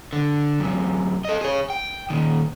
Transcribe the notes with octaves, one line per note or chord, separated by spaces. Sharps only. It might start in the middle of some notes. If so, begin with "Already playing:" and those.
D3
F#2 C3
A4 D#5
G#4 C#5
G5
A#2 D#3